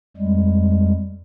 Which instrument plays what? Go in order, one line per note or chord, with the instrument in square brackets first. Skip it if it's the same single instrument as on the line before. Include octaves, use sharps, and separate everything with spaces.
[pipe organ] F2 G3 G#3